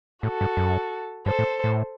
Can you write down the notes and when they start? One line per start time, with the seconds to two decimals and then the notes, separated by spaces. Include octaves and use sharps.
0.23 A2 F#4 A4
0.41 G2
0.57 F#2
1.26 G2 A4 C5
1.39 A2
1.64 A2